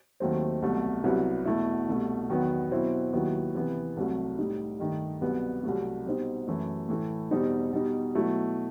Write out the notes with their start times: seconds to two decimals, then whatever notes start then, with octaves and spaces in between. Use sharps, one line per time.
0.20 D#2 D#3 F#3 A3 C4
0.62 C2 B2 F#3 A3
1.04 C2 C3 F#3 B3 E4
1.46 E2 B2 A3 E4
1.88 C2 B2 A3
2.29 E2 D#3 F#3 B3
2.71 B2 F#3 C4 E4
3.13 D#2 D#3 F#3 B3 E4
3.55 C3 E3 B3 E4
3.97 C2 C3 F#3 A3
4.38 A2 G3 D#4
4.80 G2 D#3 A3 D#4
5.21 C2 B2 F#3 B3
5.63 C2 C3 F#3 A3
6.06 B2 G3 C4 D#4
6.47 F#2 E3 A3 E4
6.88 A2 E3 A3
7.31 E2 B2 G3 C4 D#4
7.73 B2 G3 D#4
8.15 B2 F#3 A3 E4